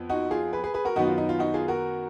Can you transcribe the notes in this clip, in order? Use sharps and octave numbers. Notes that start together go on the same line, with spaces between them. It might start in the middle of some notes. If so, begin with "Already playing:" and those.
Already playing: F2 B3
D#4 F#4
F4 G#4
G#4 B4
G#4 B4
G#4 B4
F#4 A#4
F#2 D#3 F#3 B3 D#4 F#4
F4
D#4
F4
D#4 F#4
F4 G#4
F#4 A#4